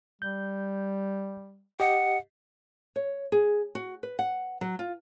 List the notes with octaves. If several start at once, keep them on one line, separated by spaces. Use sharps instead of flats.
G3 G6
G4 D#5 F#5
C#5
G#4
F#4
B4
F#5
F#3
F4